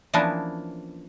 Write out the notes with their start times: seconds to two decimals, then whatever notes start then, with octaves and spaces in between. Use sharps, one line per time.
0.14 E3 F3 A#3 B3 C#4 D4